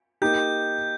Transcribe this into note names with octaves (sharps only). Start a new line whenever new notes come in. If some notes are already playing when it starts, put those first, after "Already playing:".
A#3 D#4 G4 G6